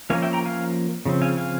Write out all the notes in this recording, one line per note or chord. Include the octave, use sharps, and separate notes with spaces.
F3 A#3 C#4 F5 G#5
E5 G5
G5 A#5
F5 G#5
C#3 F3 C4
F5 G#5
F5 G#5